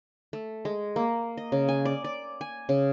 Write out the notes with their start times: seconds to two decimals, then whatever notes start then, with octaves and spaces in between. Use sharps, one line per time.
0.33 A3
0.65 G#3
0.96 A#3
1.37 D#5
1.52 C#3
1.69 G#5
1.85 D5
2.04 D5
2.41 G#5
2.69 C#3